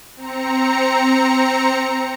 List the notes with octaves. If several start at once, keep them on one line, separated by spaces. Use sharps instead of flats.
C4 A#5 C#7